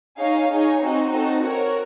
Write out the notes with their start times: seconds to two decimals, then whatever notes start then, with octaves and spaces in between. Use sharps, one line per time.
0.20 D#4 G#4 C#5 F5
0.50 D#4 G#4 C#5
0.81 C4 D#4 F#4
1.11 C4 D#4 F#4 A4
1.42 F#4 A#4 C#5